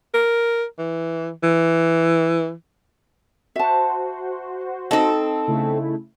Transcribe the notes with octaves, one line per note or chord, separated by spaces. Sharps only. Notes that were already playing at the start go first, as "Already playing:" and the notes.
A#4
E3
E3
F#4 C5 E5 A5
C4 D#4 A4 D#5
C#3 A3 E4